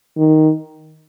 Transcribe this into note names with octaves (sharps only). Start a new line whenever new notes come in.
D#3